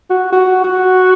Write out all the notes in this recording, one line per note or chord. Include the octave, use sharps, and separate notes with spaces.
F#4
F#4
F#4